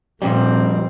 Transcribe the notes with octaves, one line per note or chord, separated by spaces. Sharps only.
F2 A#2 G3 C4